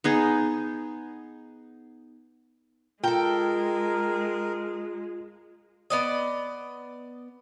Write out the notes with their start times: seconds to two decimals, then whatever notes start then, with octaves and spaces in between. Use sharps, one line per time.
0.04 B3 D#4 G#4
3.04 G#3 F4 A4 A#4 G5
5.90 B3 D5 D#5